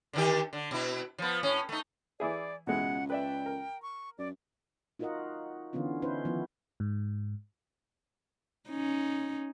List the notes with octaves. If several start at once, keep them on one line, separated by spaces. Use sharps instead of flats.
D3 D#3 G4
D3
B2 E4
F3 B3
A2 C#4
A3 D#4
E3 E4 G#4 D5
C#2 B2 G#3 E4 F#5
B4 D5 E5 G5
A#4
C#6
F#2 D5
D#4 F4 F#4 A#4 D#5 F#5
D3 E3 B3 C#4 F4
C#4 D#4 E4 B4 C5
D#3 F3 B3 E4
G#2
C#4 D#4